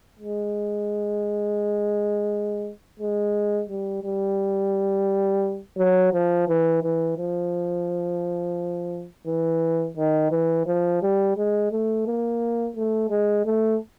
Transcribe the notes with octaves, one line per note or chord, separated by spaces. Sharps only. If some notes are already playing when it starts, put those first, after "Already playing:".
G#3
G#3
G3
G3
F#3
F3
E3
E3
F3
E3
D#3
E3
F3
G3
G#3
A3
A#3
A3
G#3
A3